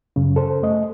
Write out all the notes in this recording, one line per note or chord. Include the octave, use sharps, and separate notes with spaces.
F#2 C#3
A4 C5
A3 D#5